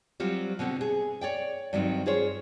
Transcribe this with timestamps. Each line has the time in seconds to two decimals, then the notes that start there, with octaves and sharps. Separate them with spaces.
0.20 F#3 G3 C4 F4 F#4
0.59 B2 D3 B3 C4
0.81 G#4
1.21 C#5 D5 G5
1.73 G2 D#3 F#3 C4
2.06 F4 G#4 C5 C#5